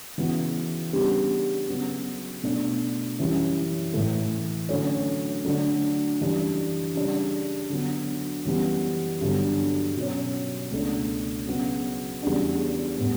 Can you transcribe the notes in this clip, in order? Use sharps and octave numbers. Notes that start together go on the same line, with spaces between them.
C#3 E3 B3 F#4
C#3 G3 B3 D4 G4
C#3 F#3 B3
B2 A3 D4
F#2 E3 G3 C#4 E4
A2 E3 A3
D3 F#3 A3 C#4
D3 F#3 A3 D4
F#2 E3 G3 D4
C#3 G3 D4
D3 F#3 B3
F#2 E3 G3 B3
G2 D3 F#3 B3
B2 F#3 C#4
C#2 B2 A3 D4
C#3 F#3 B3
E2 C#3 G3 D4 F#4
A2 G3 B3